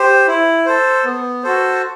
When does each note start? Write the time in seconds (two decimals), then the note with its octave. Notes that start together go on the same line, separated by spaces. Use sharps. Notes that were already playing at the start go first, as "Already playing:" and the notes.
Already playing: G4 C5
0.27 E4
0.66 A4 C5
1.04 B3
1.43 F#4 A4 C5